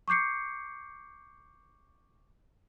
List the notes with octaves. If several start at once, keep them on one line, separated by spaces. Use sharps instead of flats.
C#6 D6 G6 C7 C#7